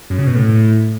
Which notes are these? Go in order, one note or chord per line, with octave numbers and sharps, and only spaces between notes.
F#2
C#3
B2
A2